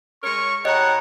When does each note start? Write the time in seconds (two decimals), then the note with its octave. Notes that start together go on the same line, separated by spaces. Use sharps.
0.24 G#3 A#4 C#5 C#6
0.65 A2 G4 C#5 D#5 F#5 A#5